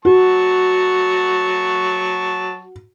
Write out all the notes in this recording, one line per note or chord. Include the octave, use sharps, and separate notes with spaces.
F#3 F#4 A5 C#6